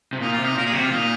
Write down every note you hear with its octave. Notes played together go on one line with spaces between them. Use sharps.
C3
A#2 D#4
F4
C3
D#4
A#2 A#4
G#4
C3 F#4
F4
A#2 D#4